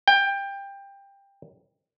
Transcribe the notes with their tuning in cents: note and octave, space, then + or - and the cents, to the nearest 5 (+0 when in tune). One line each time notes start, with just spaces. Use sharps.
G5 +20